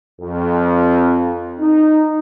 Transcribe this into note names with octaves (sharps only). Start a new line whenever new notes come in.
F2
D#4